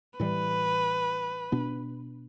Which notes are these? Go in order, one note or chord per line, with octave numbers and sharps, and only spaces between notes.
A2 E3 G3 B4
B2 B3 D4